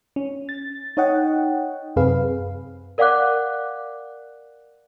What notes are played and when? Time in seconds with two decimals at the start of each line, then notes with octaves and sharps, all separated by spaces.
0.16 C#4
0.49 A6
0.97 D#4 C#5 D#5 F#5 G5
1.96 F#2 C3 C4 G#4 B4 F5
2.98 A#4 D5 F5 F#5 D6 F#6